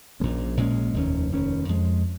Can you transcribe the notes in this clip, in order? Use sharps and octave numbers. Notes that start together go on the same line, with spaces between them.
A#1 A#2 G#3 C#4
A#1 A#2 G#3 C#4
F1 D#2 D#3 C#4
F1 D#2 D#3 C#4
F2 F3 G#3